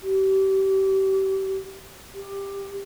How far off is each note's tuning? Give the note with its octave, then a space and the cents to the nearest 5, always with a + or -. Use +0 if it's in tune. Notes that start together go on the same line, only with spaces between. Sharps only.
G4 -30
G4 +15